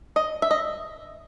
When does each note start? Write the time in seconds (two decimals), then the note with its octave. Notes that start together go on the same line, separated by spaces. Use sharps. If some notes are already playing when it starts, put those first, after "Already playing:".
0.16 D#5
0.42 E5
0.51 D#5